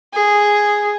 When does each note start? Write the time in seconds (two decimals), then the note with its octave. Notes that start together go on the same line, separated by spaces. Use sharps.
0.13 G#4